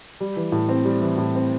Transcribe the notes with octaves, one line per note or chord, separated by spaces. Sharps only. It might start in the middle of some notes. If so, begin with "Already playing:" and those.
G3
E3
A2
C4
G3
E3
A2
C4